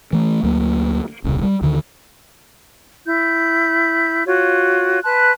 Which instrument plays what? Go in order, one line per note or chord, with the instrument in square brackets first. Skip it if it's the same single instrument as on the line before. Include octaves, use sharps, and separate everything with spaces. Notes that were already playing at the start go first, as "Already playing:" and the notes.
[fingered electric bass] E3 A3
D2 F#3 A#3
D#1 C2 C#3
G3
D2 D3 D#3
[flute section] E4 G6
F4 F#4 C#5
B4 A5 C6 F#6